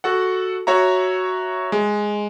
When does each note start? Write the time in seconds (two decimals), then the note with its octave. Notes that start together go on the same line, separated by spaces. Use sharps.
0.04 F#4 A4 F#5
0.67 F#4 C#5 E5 A#5
1.72 G#3